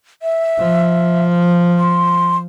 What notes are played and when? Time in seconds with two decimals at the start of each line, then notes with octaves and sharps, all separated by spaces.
0.22 E5
0.59 F3
1.79 C6